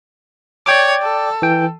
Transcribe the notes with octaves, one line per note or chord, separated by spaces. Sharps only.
C#5 D5 G5 D6
A4
E3 G5